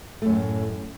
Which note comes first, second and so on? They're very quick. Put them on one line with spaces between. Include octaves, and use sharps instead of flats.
A3 F#2 A2